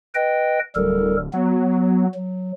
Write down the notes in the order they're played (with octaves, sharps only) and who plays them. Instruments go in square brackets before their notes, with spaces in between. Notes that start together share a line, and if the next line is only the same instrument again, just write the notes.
[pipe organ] B4 D#5 G5
[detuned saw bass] D1 [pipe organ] G3 A4 A#4
[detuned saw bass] F#3 [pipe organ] B3
[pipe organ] F#3